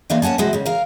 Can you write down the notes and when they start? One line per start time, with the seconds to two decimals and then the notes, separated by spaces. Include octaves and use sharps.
0.10 E3 G#3 A#3 D4 D#4
0.22 A#3 C#4 F#5 G#5 A5
0.38 C3 E3 G#3 F#4
0.53 G#2 C#3
0.66 A#4 F5